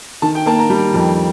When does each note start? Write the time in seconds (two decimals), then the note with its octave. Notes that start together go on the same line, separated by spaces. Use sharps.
0.22 D#3 A5
0.35 G5
0.46 A#3 A5
0.59 A#5
0.70 G3
0.94 F2